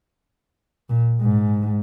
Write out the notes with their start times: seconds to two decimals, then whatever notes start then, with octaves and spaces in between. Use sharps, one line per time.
0.89 A#2
1.21 G#2